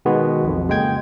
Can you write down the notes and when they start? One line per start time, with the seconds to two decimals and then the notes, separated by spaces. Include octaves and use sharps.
0.05 B2 D#3 G#3 B3 F#4
0.44 B1 F2
0.68 C#3 G#3 A#3 G5 G#6